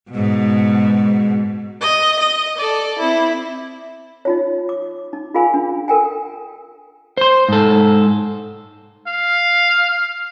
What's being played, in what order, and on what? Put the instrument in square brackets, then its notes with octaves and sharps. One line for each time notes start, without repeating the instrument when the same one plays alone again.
[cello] G#2 B2
[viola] D#5
D#5
A4 D5
C4 E4
[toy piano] D#4 F4 C#5
D6
D#4
F4 G#4 A#4 F5 G#5 B5
D4
A4 A#4 G5 G#5
[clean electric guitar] C5 C6
G#2 A4
[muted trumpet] F5